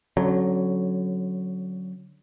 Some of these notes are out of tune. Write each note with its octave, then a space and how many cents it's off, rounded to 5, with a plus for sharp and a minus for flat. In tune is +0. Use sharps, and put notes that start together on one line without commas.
D3 -20 F#3 +0 C#4 -25